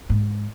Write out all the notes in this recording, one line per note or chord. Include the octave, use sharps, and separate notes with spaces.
G#2